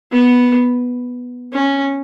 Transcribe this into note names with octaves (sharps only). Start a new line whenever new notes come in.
B3
C#4